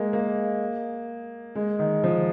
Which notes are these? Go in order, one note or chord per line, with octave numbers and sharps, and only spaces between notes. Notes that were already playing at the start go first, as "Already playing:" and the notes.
Already playing: G#3 A#3
A#3
G#3
D#3
F3